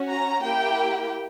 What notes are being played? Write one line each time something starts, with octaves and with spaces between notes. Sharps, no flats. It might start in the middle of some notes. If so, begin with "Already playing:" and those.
Already playing: C#4 F#4
A#5
A#3 E4 G4 G5